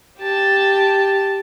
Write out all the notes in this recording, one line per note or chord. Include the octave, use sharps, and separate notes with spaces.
G4 A5